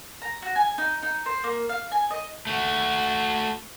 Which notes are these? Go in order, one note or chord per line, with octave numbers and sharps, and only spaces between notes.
A#5
F#4
G#5
D#4
D#4
C5
A#3
F5
G#5
D#5
A3 F#4